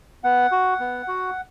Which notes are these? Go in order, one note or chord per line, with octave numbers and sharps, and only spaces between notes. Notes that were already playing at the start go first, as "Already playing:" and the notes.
B3 F#5
F#4
B3
F#4